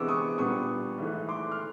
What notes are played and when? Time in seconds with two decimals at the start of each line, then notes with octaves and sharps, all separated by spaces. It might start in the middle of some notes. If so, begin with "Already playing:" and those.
Already playing: C3 E3 G#3 B3 D4 D6 E6
0.08 C#6 D#6
0.38 A#2 G3 B3 D4 C#6 D#6
0.98 G#2 E3 A3
1.29 C6 D6
1.52 F6